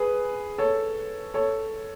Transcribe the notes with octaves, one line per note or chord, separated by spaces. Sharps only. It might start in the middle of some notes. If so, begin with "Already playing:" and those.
Already playing: G#4 B4
A4 C#5
A4 C#5